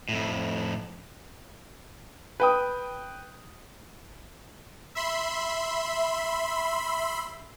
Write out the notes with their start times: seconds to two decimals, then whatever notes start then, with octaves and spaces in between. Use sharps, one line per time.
0.09 F2 A2
2.40 B4 G5 D#6
4.95 E5 B5 C6